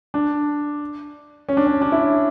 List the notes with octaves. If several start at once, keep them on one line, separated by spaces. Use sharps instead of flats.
D4
C#4
D4
C#4
D4
E4